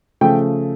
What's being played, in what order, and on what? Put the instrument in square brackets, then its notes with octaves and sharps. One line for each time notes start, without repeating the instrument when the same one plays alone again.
[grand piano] C#3 F3 A3 G5